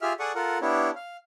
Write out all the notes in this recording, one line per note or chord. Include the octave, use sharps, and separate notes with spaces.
F4 G4 G#4 E5 F6
G#4 A4 D5 F#5 C#6 D#6
F4 A4 A#4 F#5
B3 D4 E4 G4 C#5
F5